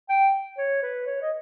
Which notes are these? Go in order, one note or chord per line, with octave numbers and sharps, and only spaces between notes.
G5
C#5
B4
C#5
D#5